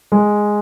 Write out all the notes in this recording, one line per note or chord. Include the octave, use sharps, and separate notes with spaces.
G#3